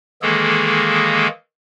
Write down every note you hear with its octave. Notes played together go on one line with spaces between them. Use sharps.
D#3 E3 G#3 A#3 G#4 A4